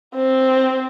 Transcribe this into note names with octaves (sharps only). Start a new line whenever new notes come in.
C4